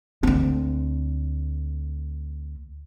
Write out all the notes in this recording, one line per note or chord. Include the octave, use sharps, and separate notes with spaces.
D2 C4